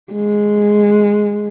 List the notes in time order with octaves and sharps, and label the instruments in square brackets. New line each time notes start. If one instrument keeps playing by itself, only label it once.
[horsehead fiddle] G#3